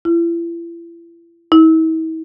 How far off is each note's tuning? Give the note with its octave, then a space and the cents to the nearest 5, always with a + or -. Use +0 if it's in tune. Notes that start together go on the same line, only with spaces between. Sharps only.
E4 +40
E4 -45